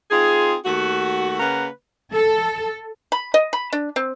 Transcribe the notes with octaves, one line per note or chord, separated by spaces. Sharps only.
C4 D#4 F4 G#4
D#2 A3 F#4
C#3 A#3 A#4 B4 F#5
A4
B5
D#5
B5
D4
C4